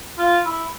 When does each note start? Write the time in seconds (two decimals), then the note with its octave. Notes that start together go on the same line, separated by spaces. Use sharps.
0.18 F4
0.45 E4